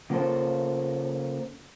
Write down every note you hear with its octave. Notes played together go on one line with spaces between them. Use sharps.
C#3 A#3 F4 A4 C5